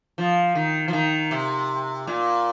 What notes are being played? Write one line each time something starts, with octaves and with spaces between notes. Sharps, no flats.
F3
D#3
F3
D#3
C3
A#2